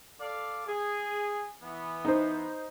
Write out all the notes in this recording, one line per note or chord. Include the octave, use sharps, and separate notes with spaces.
A4 D5 F5
G#4
E3 B3
D#4 C5